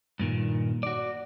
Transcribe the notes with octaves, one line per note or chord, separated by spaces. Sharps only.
G2 A#2 D#3
F#4 D5